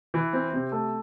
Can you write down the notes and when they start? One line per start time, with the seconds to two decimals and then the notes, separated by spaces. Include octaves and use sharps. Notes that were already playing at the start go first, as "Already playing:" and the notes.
0.14 E3
0.33 C4
0.53 C3
0.72 A3